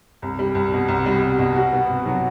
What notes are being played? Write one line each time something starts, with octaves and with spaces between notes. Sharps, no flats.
C2
G3
C2
B2
C2
G3
C2
B2
F#4
B3
C3
F#3